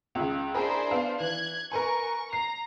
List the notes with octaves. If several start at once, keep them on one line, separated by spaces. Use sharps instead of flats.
C#2 C#3
D4 E4 G#4 A#4 C5 B5
B3 F5
E3 F#6 G#6
A#4 B4 G#5 C#6
A#5 C7